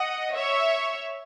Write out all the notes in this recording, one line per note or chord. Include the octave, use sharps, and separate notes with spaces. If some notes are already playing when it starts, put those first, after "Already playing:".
Already playing: D#5 F#5
C#5 E5